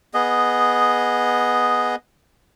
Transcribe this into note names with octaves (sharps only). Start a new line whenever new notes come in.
B3 G#4 D#5